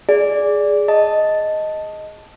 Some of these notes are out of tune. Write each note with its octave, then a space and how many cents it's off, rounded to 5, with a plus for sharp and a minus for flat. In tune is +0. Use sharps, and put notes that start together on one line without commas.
G#4 +0 D5 -10
D#5 +5 A5 +0